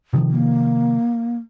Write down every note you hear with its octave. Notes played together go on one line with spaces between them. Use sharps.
C3 D#3 F3
A#3